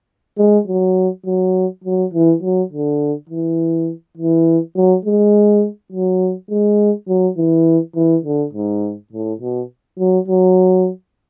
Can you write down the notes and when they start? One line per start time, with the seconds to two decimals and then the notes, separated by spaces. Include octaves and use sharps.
0.38 G#3
0.67 F#3
1.25 F#3
1.84 F#3
2.14 E3
2.42 F#3
2.72 D3
3.29 E3
4.17 E3
4.76 F#3
5.05 G#3
5.92 F#3
6.51 G#3
7.08 F#3
7.37 E3
7.96 E3
8.25 D3
8.53 G#2
9.13 A2
9.41 B2
9.99 F#3
10.28 F#3